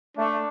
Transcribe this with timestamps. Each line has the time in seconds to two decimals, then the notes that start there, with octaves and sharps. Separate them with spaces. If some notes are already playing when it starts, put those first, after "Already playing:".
0.17 A3 D4